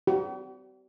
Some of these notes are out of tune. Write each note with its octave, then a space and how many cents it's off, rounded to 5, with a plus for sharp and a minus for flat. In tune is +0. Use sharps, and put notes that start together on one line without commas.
G4 -45